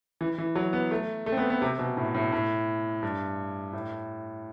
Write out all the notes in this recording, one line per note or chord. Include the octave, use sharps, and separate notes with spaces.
E3
E3
F#3
B3
A3
A3
C4
B3
B3
C3
B2
A2
A2
A2
G2
A2